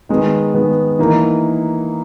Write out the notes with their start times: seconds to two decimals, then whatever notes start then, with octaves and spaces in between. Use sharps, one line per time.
0.09 D#3 G#3 B3
0.54 D#3 G#3 B3
0.99 E3 A#3 D#4 A#4